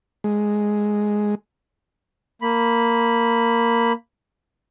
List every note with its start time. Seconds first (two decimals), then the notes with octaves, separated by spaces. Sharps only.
0.24 G#3
2.42 A#3 B5